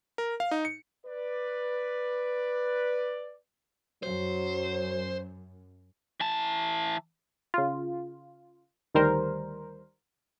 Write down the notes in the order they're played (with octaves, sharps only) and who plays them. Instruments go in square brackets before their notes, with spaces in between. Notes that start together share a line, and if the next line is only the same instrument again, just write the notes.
[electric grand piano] A#4
F5
D#4
C#7
[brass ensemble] B4 D5
[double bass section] F#2 [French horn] F#3 [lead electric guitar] C5
[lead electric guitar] E3 A5
[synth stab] C#3 F4
D2 D#3 G3 A#4 C5